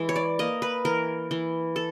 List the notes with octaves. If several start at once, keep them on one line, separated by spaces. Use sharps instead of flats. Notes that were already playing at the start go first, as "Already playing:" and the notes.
Already playing: E3 G#3
C#5
D5
A#3 D#5
B4
E3 A#4
E3
A4